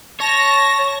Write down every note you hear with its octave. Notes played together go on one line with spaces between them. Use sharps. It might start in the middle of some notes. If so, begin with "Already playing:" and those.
C#5 A5 C#6 A#6